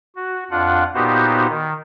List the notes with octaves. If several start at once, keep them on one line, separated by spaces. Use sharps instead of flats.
F#4
F2 D4 F4 F#5
A#2 B3 D#4 F#4 G4 C5
D#3